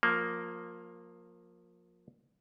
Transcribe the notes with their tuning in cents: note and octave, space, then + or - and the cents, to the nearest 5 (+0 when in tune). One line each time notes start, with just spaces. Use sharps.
F3 +25 A#3 +0